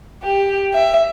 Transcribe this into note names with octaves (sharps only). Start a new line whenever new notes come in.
G4
E5